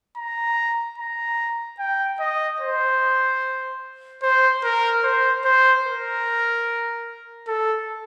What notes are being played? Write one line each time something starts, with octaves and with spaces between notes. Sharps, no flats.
A#5
A#5
G5
D#5
C5
C5
A#4
C5
C5
A#4
A4